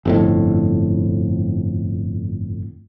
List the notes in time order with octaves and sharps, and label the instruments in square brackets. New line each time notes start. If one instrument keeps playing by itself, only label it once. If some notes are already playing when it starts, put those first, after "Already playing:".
[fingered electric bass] G1 F2 A2